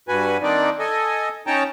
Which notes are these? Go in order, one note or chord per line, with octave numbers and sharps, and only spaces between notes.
G2 F#4 B4 G#5
D#3 A#3 C4 D4 D#4 D5
A4 D#5 G#5
C#4 D#4 C#5 G5 A5 A#5